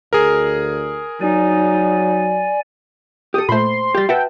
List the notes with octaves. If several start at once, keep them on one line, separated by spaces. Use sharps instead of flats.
D2 G#4 A#4
F#3 D#4 D5 G#5
G4 A4 D#6
A#2 A3 C5 B5 C6
G3 G4 G6 A6
F#4 B4 E5 F#5 G5 A5